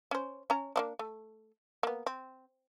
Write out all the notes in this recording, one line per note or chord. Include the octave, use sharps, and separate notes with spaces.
C#4 C5
C#4 A#5
A#3 C#4 D4
A3
A#3 B3
C4